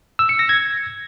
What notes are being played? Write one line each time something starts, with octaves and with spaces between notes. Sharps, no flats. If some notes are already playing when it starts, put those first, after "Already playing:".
E6
C#7
A#6
G#6